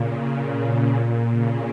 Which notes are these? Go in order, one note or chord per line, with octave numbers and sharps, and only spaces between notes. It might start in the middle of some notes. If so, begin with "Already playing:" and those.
Already playing: A#2 C#3
A#2
A#2
C#3